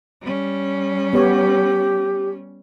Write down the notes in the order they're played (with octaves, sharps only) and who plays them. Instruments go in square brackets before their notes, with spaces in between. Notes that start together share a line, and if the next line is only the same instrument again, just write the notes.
[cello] G3 C#4
[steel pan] B3 C#5 [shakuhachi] G4